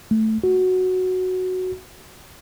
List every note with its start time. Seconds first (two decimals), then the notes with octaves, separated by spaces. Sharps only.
0.11 A3
0.44 F#4